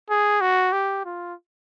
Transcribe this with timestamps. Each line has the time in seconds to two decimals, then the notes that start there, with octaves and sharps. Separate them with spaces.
0.10 G#4
0.41 F#4
0.73 G4
1.05 F4